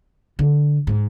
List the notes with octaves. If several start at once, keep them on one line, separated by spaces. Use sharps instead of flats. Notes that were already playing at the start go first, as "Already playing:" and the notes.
D3
G#2